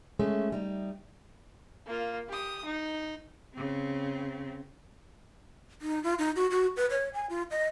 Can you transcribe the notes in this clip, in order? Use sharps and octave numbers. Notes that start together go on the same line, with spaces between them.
G#3 A3 C#4
G3 D#4
A#3 F4
G4 D#6
D#4
C#3 C4
D#4
F4
D#4
F#4
F#4
B4
C#5
G#5
F4
D#5